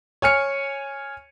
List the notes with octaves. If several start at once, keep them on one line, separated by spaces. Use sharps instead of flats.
C#5 G#5 F6 C#7